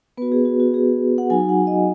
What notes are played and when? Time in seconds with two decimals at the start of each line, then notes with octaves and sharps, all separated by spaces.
0.17 B3 F#4 B4
0.32 G#4
0.45 F#4
0.60 F#4
0.74 G#4
1.18 F#5
1.30 F#3 D#4 F#4 G#5
1.49 F#5
1.67 D#5